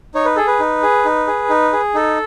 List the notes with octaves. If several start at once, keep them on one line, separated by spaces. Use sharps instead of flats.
D#4 C#5
B4
G#4 A4
B4
D#4
G#4
D#4
G#4
D#4
G#4
D#4 A4